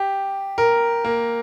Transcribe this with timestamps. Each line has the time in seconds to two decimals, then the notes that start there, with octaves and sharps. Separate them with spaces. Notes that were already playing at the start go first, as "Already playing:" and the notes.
Already playing: G4
0.58 A#4
1.05 A#3